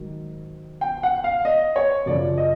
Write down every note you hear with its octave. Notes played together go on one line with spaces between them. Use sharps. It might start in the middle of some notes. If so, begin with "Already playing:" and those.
Already playing: G#2 D#3 F#3
G5
F#5
F5
D#5
C#5
F#2 C#3 F3 D5
D#5